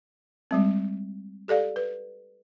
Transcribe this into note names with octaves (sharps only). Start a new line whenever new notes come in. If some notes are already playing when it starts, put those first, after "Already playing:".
G3 G#3 C4
G4 A4 D5 F5
B4